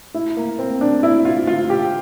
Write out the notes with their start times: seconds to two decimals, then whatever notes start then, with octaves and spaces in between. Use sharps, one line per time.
0.14 E4
0.37 A#3
0.59 C4
0.81 D4
1.03 E4
1.25 F4
1.47 F4
1.70 G4